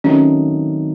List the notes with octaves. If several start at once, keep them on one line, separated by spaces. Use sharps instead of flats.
D#3 F#3 A3 C4 C#4 D#4